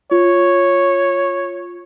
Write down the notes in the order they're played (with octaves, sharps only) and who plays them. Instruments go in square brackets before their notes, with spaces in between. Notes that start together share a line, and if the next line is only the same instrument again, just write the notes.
[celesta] F4 [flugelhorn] C#5